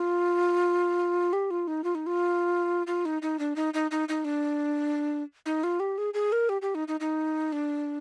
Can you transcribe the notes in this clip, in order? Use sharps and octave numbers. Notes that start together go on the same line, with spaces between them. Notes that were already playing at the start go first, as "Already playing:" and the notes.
Already playing: F4
G4
F4
D#4
F4
D#4
F4
F4
D#4
D#4
D4
D#4
D#4
D#4
D#4
D4
D#4
F4
G4
G#4
G#4
A#4
G4
G4
D#4
D#4
D#4
D4